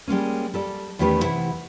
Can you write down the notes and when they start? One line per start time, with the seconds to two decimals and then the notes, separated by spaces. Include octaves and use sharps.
0.08 G3 G#3 A#3 C#4
0.54 G3 A4 D5
0.99 E2 D#3 A3 C#4 G4 B4
1.22 C3 E3 E4 F#5